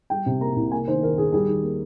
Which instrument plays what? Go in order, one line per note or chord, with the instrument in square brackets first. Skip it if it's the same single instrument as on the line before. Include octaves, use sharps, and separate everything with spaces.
[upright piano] G3 G5
C3
A#3 A#5
C2
A#3 G#5
D#3 C5
D#2 A#4
D#2 G#4
G3 G#4
D#3
A#3